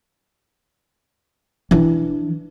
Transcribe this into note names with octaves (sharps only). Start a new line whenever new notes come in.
E3 D4